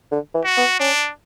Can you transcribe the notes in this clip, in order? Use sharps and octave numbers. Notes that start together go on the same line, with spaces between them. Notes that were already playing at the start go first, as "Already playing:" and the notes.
D3
E3
F#4
B3
C#4 D4